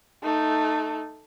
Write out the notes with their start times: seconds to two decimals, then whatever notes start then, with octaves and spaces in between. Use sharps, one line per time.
0.23 A3 D#4